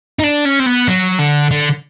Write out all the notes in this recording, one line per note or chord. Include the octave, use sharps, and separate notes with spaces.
D#4
D4
C#4
C4
B3
F#3
D3
D3